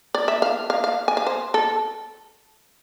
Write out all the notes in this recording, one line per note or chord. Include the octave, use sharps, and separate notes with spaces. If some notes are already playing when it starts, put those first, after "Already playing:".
D5
E5
F5
F5
F5
G#5
F5
C5
A4